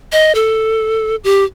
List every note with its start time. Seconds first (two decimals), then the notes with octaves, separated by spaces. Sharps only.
0.12 D#5
0.35 A4
1.24 G4